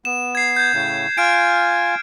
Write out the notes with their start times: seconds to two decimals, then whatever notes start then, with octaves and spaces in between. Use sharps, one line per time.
0.05 B3 E7
0.35 G#6 C7
0.56 G6 G#6
0.74 A2 C#3
1.18 F4 G#5 F6 G#6 D7